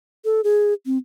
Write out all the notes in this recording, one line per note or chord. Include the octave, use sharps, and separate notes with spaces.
A4
G#4
C4